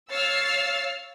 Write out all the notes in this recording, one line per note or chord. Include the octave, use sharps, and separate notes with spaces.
C#5 F5 E6 F6 A6 C7